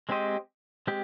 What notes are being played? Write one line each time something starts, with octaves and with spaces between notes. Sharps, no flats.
G#3 C4 G4 C5 D#5
G#3 C4 G4